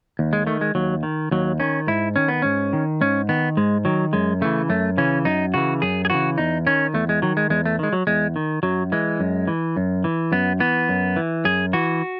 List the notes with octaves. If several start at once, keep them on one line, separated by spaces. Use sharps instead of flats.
D#2
G#3
D#3 A3
G#3
D#2 F#3
D#3
D#2 F#3
D#3 C#4
G#2 E4
D#3 C#4
B3
G#2 C#4
D#3
G#2 C#4
D#3 B3
G#2 G#3
D#3 F#3
F#2 G#3
C#3 E3 A3
F#2 A3
C#3 E3 C#4
F#2 D#4
C#3 E3 F#4
F#2 G#4
G#4
C#3 E3 F#4
E2 D#4
D#3 C#4
E2 A3
G#3
D#3 F#3
G#3
E2 G#3
A3
D#3 G#3
F#3
E2 G#3
D#3
F#2 F#3
E3 G#3
F#2
E3
F#2
E3
F#2 B3
E3 B3
F#2
E3
F#2 G#4
E3 F#4